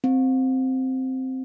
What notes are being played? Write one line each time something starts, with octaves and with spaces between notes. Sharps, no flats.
C4